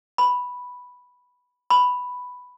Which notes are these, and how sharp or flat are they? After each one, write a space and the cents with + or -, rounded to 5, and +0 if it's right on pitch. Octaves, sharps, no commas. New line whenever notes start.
B5 +0
B5 +5